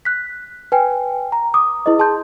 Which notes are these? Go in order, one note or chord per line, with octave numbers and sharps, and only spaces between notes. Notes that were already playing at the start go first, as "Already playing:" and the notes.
F#6 B6
B4 G5 G#5
A#5
D6 D#6
E4 G#4 B4 D#5
G#4 A5 C6 G6